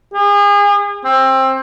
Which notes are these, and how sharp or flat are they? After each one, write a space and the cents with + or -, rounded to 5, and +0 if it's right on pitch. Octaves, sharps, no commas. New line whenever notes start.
G#4 -35
C4 +20